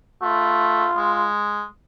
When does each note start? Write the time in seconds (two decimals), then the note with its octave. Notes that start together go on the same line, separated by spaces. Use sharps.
0.22 A3 F4
0.97 G#3